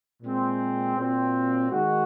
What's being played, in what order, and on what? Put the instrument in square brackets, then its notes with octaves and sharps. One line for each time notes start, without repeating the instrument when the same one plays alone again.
[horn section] A#2 G#3 C4
A#2 F#3 C4
D#3 G#3 D#4 F#4